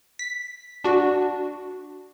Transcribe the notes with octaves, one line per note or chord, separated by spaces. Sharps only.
B6
D4 F#4